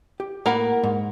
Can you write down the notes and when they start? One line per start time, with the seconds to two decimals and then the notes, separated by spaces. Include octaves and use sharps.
0.20 G4
0.46 A2 A#3 A#4 F#5 B5
0.84 G#2